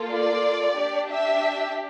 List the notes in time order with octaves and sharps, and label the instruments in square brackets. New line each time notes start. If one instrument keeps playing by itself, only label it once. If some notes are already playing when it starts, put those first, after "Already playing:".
Already playing: [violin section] A#3 F4 A4
D5
D4 G4
E5